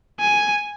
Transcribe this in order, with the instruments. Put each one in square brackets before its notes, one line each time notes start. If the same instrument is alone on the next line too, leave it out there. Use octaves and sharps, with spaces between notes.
[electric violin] G#5